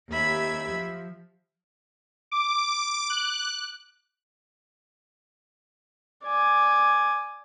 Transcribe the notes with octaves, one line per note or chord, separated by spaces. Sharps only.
D#2 G4 E5 B5 G#6
F3
D6
F#6
D5 G#5